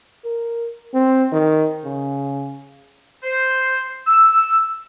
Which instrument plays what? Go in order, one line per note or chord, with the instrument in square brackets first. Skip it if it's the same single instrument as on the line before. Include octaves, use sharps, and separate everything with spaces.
[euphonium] A#4
C4
D#3
C#3
[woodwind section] C5
E6